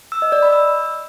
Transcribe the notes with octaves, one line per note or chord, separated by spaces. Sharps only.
E6
D#5
D5
B5
E6